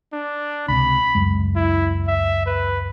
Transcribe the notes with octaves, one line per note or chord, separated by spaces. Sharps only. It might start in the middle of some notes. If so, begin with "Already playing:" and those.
D4
C#2 C3 B5
C#2 F#2 G#3
E4
E5
B4